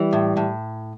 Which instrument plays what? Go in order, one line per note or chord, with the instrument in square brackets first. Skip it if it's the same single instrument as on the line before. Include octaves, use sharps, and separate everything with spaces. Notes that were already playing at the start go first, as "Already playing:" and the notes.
Already playing: [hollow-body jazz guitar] E3 [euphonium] G3
[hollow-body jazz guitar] A2
A2